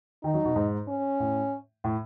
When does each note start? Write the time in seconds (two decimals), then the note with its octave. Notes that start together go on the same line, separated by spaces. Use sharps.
0.24 D#3 D#4
0.34 F#3
0.45 B2
0.56 G#2
0.88 C#4
1.20 A2
1.84 A2